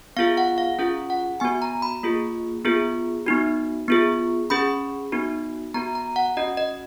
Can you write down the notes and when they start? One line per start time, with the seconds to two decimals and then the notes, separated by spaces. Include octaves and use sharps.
0.17 B3 F4 G#4 F5
0.37 F#5
0.58 F5
0.79 C#4 F4 G#4 F#5
1.10 F#5
1.40 B3 F#4 G#5
1.62 A#5
1.82 B5
2.03 A#3 F4 G#4
2.65 B3 F4 G#4
3.26 B3 D#4 F#4
3.88 B3 F4 G#4
4.50 C#4 G#4 B5
5.12 B3 D#4 F#4
5.74 B3 F#4 A#5
5.95 A#5
6.16 F#5
6.37 C#4 F#4 D#5
6.57 D#5